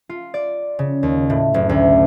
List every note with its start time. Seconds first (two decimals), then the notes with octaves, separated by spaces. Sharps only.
0.09 F4
0.34 D5
0.79 C#3
1.03 D#2
1.30 A2
1.54 F#1
1.69 D2